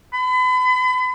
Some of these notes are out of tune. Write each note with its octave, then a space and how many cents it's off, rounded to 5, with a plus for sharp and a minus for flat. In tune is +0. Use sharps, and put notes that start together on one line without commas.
B5 +40